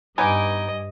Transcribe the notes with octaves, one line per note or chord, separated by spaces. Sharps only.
G2 B3 D#4 D#5 G#5 D6